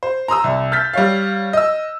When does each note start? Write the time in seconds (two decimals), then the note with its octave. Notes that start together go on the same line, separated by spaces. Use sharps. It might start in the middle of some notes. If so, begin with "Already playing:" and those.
0.03 C5
0.28 A#5 C6 D#6 E6
0.44 C2
0.72 F6 G6 A6 B6
0.93 G3 C#5 F5
1.53 D#5 E6